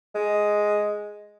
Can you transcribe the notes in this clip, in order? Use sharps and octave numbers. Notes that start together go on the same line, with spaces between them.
G#3